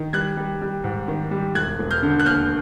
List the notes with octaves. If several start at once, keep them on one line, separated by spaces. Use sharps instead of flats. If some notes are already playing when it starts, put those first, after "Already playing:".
Already playing: D#3
G3 F#6 G#6
G3
G3
G#2
D#3
G3
E1 F#6 G#6
E1
F6 G6
D3
F#6
D#2 F6 G6